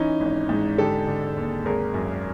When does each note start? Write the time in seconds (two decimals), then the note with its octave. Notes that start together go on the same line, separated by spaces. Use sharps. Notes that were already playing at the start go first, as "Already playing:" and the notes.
Already playing: E3 C#4 D#4
0.20 G#1
0.49 G#2
0.78 D3 G4 A4
1.07 D3
1.37 D#2
1.65 G#1 G#4 A#4
1.94 F#2